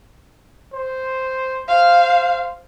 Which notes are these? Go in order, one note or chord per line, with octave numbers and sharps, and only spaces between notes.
C5
C5 F5